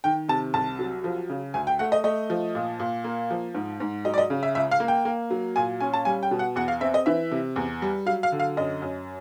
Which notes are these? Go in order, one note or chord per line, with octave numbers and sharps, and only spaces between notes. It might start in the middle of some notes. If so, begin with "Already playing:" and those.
D#3 G5
C3 A5
C2 A5
F#3
F3
C#3
D2 G#5
G5
A3 F#5
D#5
A3 D#5
F3
A#2
A#2
A#3
F3
G#2
G#2
F#3 D#5
D5
D#5
C#3
E5
C#2 E5
F5
A#3
G5
A#3
F#3
A#2 G#5
C#4 G#5
A5
G3 G#5
G5
B2
F#5
E2 F#5
F5
C4 E5
D#5
E3 E5
C3
E2
G3
F#3 F5
F5
D3
F5
F#2 D#5
F#2